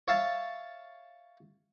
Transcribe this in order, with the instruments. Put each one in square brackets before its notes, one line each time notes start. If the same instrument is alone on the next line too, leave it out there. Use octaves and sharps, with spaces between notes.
[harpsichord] C#5 E5 F5 A5